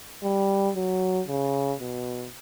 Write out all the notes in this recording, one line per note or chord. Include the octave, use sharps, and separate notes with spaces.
G3
F#3
C#3
B2